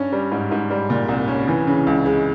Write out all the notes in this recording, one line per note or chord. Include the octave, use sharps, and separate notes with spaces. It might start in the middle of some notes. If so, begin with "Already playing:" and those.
Already playing: G2 C#4
G3
G#2
G#2
G3
A#2
C2
C#4
E3
C#3
C#2
G#3